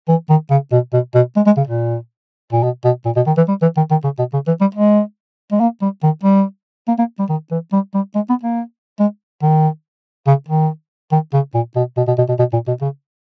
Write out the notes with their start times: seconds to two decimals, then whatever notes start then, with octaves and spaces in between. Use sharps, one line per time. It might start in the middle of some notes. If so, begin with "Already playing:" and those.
0.09 E3
0.30 D#3
0.51 C#3
0.72 B2
0.93 B2
1.15 B2
1.36 G#3
1.47 G#3
1.57 C#3
1.68 A#2
2.53 A#2
2.63 B2
2.85 B2
3.06 A#2
3.16 B2
3.27 D#3
3.37 E3
3.49 G3
3.62 E3
3.77 D#3
3.91 D#3
4.04 C#3
4.19 B2
4.33 C#3
4.47 E3
4.61 G3
4.75 G#3
5.52 G#3
5.61 A#3
5.82 G3
6.03 D#3
6.24 G3
6.88 A#3
6.99 A#3
7.20 G3
7.30 D#3
7.51 E3
7.73 G3
7.94 G3
8.15 G#3
8.30 B3
8.44 A#3
9.00 G#3
9.42 D#3
10.27 C#3
10.49 D#3
11.12 D#3
11.34 C#3
11.55 A#2
11.76 B2
11.97 B2
12.08 B2
12.18 B2
12.29 B2
12.39 B2
12.53 A#2
12.68 B2
12.82 C#3